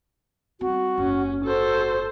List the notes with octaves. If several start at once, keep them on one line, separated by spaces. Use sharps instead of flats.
G3 C4 F#4
F#1 G#2 C#4
F#4 A4 C5